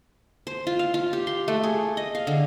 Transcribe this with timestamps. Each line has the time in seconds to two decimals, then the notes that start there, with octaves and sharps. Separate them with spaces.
0.47 C5
0.67 F4
0.79 F5
0.94 F4
1.13 G4
1.27 C6
1.48 A3
1.63 G#4
1.97 D#5
2.15 F5
2.27 D3